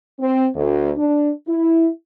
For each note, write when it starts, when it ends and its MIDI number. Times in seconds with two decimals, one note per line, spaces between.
0.20 0.47 60
0.55 0.91 38
0.97 1.29 62
1.48 1.88 64